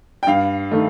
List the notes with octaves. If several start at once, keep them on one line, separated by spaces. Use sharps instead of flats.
G5
G2 F5
D#3 A3